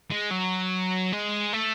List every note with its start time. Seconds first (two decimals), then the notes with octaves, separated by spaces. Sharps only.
0.11 G#3
0.31 F#3
1.13 G#3
1.53 A3